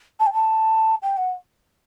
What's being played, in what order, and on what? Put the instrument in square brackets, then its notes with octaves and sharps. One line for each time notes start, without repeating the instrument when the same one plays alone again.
[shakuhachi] A5
G5
A5
G5
F#5